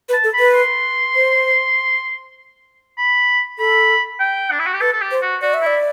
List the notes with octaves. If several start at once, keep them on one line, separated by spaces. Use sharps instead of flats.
B4
A5
A4
B5
B4
C6
C5
B5
A4 B5
G5
D4
E4
F#4
G4
A4 B4
A4
G4
C5
F#4
F#4 D5
E5
E4 D5